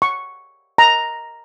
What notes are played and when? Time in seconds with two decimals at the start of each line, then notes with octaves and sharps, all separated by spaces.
0.02 C#6
0.78 A#5